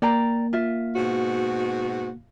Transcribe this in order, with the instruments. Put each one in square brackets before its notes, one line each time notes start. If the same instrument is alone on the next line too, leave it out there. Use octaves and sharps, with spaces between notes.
[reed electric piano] A#3 [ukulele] D5 G5 A#5
[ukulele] F4 E5
[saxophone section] G#2 B2 F#4